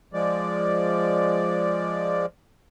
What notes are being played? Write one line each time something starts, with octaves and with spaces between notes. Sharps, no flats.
F3 G#3 D5